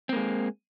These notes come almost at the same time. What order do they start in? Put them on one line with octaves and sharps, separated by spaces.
C4 A#3 G#3